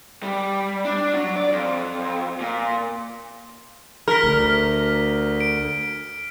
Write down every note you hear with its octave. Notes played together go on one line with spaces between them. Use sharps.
G3
D4
F#3
D5
F2
A#2
A#4 F6 B6
D2
D7